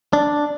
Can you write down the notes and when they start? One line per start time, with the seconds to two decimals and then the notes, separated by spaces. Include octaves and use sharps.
0.13 D4